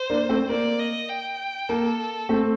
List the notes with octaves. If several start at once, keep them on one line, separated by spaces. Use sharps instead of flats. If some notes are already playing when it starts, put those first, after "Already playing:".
Already playing: C5
A#3 D4
A3 C4
A#3 D5
D#5
G5
A#3 A4
A3 C4